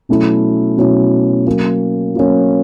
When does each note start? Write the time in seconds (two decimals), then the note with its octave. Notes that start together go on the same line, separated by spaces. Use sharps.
0.09 B2 F#3 A3 C#4 E4
0.77 B2 F#3 A3 C#4 E4
1.47 F#3 A#3 C#4
2.15 F#3 A#3 C#4